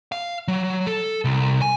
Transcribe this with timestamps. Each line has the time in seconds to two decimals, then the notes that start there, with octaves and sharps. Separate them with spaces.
0.12 F5
0.48 F#3
0.87 A4
1.25 C2
1.62 G#5